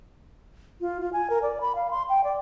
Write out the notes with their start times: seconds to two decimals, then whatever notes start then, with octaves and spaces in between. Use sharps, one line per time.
0.81 F4
1.01 F4
1.13 G#5
1.30 A#4
1.42 D5
1.61 B5
1.75 F5
1.91 C6
2.09 G5
2.24 D5